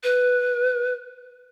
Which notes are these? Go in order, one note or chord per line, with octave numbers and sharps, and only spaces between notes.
B4